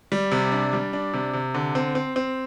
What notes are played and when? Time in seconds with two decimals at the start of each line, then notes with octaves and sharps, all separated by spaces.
0.12 G3
0.31 C3
0.52 D4
0.73 G3
0.93 D4
1.13 C3
1.33 C3
1.55 D3
1.75 C4
1.95 C4
2.16 C4